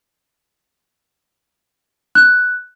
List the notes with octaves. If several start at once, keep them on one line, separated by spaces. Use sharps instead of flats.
F#6